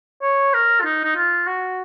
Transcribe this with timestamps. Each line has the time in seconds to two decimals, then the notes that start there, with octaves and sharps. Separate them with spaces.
0.22 C#5
0.54 A#4
0.80 F4
0.85 D#4
1.04 D#4
1.16 F4
1.47 F#4